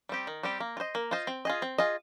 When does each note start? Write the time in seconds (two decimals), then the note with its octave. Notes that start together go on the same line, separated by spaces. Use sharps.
0.09 G3 C4 G4
0.27 D#3
0.43 G3 C4 G4
0.60 A#3
0.77 F4
0.80 C5 D#5
0.95 A#3
1.11 F4 C5 D#5
1.27 C4
1.45 F4 G#4 D#5
1.62 C4
1.78 F4 G#4 D#5